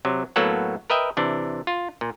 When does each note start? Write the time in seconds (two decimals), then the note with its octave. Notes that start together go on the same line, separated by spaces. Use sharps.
0.05 C3 F#3
0.36 A2 F#3 A#3 B3 A4 F#5
0.90 A#4 B4 D#5 E5 G5
1.17 C3 E3 D4
1.67 F4
2.01 A#2